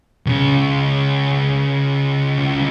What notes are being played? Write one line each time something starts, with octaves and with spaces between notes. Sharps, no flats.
C#2 C#3